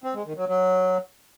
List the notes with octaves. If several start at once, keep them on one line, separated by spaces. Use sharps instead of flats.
C4
G#3
D#3
F#3
F#3